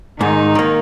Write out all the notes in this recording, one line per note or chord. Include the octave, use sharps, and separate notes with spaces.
G#2 D#3 D#4
D#3 A#3